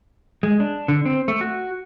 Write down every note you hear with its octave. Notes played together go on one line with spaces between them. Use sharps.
G#3
D4
D3
C4
A3
F#4